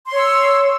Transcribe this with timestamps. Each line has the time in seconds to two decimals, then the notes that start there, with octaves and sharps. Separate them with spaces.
0.06 C6
0.11 C#5
0.16 E6